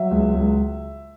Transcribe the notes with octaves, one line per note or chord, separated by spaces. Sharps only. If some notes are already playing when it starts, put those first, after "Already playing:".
Already playing: F#3 E5
C#2
C#2